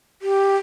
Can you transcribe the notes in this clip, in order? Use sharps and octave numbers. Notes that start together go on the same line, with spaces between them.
G4